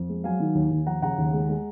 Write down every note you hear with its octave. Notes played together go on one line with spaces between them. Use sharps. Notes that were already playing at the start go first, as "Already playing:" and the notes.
Already playing: F2
G#3
F#3 F5 G#5
D#3
D#2
D#2
F3 F#5 A#5
C#3 F#5 A#5
D#2
G#3
G#3